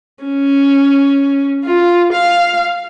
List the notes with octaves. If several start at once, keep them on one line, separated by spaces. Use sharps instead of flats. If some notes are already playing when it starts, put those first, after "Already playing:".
C#4
F4
F5